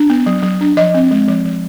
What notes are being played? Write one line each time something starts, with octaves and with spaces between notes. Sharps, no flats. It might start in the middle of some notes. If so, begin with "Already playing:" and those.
Already playing: D4
B3
F#3
F#3
D4
F3 D#5
C4
G#3
F3
F3